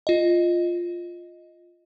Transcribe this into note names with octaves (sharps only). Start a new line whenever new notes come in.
F4 D#5